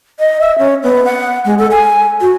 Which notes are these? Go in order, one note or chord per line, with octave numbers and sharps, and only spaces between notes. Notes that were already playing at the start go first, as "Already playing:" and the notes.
D#5
E5
C#4
B3
F#5
G#3
A4
G#5
F#4